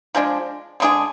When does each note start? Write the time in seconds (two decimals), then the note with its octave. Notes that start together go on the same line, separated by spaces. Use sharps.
0.15 F3 G#3 D4
0.80 D3 G#3 D4 G#4